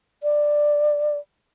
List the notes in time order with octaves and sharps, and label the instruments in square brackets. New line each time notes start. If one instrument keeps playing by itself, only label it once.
[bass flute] D5